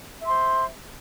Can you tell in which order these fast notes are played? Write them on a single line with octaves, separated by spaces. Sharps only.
E5 C6 C5